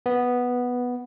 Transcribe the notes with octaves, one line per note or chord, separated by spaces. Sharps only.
B3